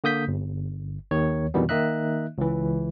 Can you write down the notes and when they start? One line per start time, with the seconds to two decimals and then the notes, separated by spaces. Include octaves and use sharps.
0.04 D3 A#3 D#6 G6 B6
0.28 G1
1.11 D#2 D#3 C#5
1.54 F2 B2 D#3 E3 G3 B3
1.69 D#3 A#3 D#4 D#5 E5 F#6
2.38 C#2 E3